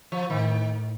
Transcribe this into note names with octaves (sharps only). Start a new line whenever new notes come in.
F3
A2 D#3